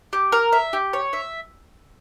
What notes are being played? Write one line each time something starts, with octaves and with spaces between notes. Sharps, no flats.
G4
A#4
E5
G4
C#5
E5